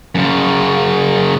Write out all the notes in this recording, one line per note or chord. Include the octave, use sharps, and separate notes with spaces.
F#2 C#3